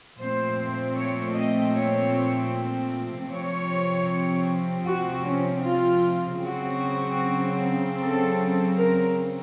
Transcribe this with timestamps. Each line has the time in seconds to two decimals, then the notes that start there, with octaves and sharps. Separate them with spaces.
0.18 A#2 F3 A3 C4 C5
0.96 C#5
1.35 D#5
1.74 C#5
3.31 C3 F3 C4 C#5
4.87 F#4
5.26 C#4
5.65 F4
6.43 C#3 F#3 C4 F#4
7.99 A4
8.78 A#4